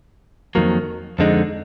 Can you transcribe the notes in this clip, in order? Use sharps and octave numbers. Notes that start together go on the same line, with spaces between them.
F2 D#3 F#3 A#3
F2 D3 G#3 D#4